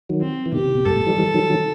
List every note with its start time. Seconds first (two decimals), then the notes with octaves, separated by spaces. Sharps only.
0.09 D#3 F#3
0.21 C4
0.46 E3
0.53 B2 D#3 G4
0.64 C3
0.75 B2
0.85 G2 A4
0.96 A2
1.07 E3 G3
1.18 E3 G3
1.34 D#3 F#3
1.50 D#3 F#3